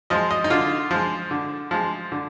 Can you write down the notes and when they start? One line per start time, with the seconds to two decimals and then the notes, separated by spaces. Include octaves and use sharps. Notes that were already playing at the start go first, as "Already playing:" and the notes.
0.10 F3 G#3 D#5
0.31 D#5
0.44 D#4
0.50 D3 F4
0.91 F3 G#3
1.31 D3
1.71 F3 G#3
2.12 D3